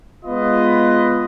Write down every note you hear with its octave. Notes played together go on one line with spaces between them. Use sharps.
G#3 B3 F4 B4 D#5